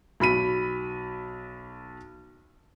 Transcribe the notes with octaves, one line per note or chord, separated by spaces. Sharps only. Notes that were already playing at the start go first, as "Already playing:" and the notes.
B1 B5 B6 D#7